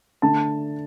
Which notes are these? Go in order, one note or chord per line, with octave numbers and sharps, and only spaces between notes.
D3 A3 D4 A5